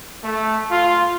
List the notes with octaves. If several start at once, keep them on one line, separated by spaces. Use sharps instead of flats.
A3
F4